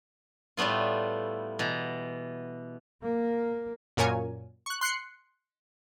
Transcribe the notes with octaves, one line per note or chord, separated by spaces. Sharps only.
A2 G3 A3 B3 F4
B2 E3 A#5
A#3
F#2 A#2 A#4 C#5 G#5
C#6 F#6
C6 F#6 C7 C#7